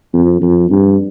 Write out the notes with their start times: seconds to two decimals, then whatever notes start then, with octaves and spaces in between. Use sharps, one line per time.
0.13 F2
0.41 F2
0.71 G2